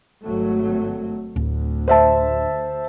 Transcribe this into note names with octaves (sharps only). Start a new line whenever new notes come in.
G#1 F#3 A3
D1 D2
C5 E5 A5